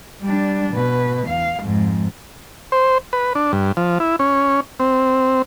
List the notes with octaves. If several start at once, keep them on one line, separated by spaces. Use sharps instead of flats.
G3 D4
B2 B4
E2 F5
F2 G#2
C5
B4
D4
G2
F3
E4
C#4
C4